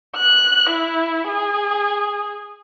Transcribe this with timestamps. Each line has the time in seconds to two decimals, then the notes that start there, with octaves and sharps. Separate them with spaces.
0.16 F#6
0.70 E4
1.29 G#4